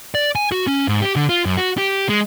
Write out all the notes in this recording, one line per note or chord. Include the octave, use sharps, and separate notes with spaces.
D5
G#5
F#4
C#4
G#2
G4
D3
F4
F#2
F#4
G4
G#3